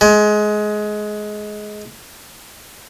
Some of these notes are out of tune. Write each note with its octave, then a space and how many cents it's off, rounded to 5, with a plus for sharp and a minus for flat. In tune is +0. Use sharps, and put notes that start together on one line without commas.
G#3 +20